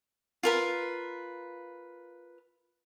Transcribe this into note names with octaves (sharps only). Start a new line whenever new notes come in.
F4 A#4 B4